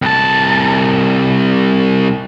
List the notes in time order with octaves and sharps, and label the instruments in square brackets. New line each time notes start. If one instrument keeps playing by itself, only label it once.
[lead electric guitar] C2 A5